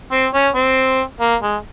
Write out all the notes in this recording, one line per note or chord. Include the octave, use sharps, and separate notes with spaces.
C4
C#4
C4
A#3
G#3